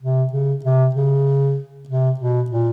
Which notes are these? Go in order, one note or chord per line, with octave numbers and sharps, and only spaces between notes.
C3
C#3
C3
C#3
C3
B2
A#2